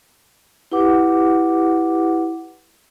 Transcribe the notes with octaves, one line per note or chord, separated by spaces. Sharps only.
E4 G4 B4 F#5 D6